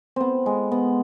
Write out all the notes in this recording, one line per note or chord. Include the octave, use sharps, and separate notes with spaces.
B3 C4
G#3
B3